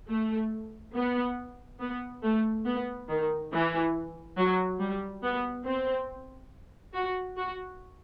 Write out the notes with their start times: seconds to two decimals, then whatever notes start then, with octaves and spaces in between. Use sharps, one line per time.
0.09 A3
0.94 B3
1.80 B3
2.23 A3
2.65 B3
3.08 D#3
3.52 E3
4.37 F#3
4.79 G3
5.23 B3
5.66 C4
6.94 F#4
7.37 F#4